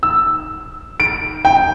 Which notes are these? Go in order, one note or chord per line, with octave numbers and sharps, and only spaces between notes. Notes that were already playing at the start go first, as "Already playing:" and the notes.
E6
D7
G5